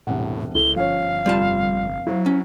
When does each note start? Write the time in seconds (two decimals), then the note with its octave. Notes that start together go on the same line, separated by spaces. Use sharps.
0.07 E1 C2 A2 F#5
0.55 C#2 E4 A4 G7
0.76 G1 F3 C#4 C#5 F5
1.26 F1 G3 F4 A5
2.07 F#3 E4 C5
2.26 C#4